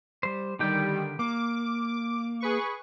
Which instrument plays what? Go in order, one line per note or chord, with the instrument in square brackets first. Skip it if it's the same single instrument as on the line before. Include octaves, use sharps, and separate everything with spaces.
[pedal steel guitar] G3 C5
[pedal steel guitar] D3 G4 G5 [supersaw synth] D#3 G3
[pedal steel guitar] A#3 [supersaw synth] D6
[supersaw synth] G#4 B4 C#6